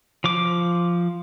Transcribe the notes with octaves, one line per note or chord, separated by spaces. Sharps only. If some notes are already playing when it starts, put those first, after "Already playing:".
F3 D6